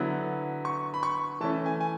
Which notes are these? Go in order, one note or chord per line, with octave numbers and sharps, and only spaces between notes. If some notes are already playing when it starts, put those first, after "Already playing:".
Already playing: D3 F#3 B3 E4
C#6
B5
C#6
E3 A3 C#4 A5
G#5
G#5